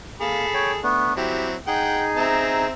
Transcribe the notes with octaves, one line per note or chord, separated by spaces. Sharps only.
A#3 G#4 A4 B5
C#5 G5
A3 B3 D4
F#3 C4 E4 G4
D#4 G#4 F#5 G5
C4 E5 A#5